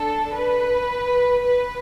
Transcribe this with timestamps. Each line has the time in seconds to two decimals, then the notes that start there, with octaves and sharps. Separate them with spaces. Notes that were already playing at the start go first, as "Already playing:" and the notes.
Already playing: D4 A4
0.33 B4
1.44 B4